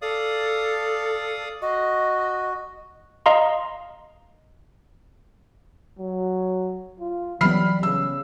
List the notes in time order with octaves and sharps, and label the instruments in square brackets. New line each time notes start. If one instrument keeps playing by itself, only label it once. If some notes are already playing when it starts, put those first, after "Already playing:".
[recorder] A4 [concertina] D5 F5 D#6
[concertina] F#4 [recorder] D#5
[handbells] D#5 F5 A#5 C6
[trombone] F#3
F4
[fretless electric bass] E3 F#3 B3 [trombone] G3 [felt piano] B5 F6 C7
[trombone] C#3 [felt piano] E6